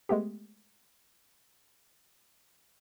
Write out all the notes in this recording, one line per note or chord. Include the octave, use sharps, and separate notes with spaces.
G#3 A3 B3 G4